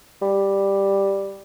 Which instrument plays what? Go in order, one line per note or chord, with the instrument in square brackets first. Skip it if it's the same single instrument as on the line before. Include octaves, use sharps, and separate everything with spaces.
[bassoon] G3